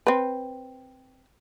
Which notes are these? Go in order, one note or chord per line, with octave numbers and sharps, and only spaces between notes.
C4 B4